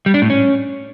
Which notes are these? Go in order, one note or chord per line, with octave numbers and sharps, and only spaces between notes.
G3
D4
A2
C#4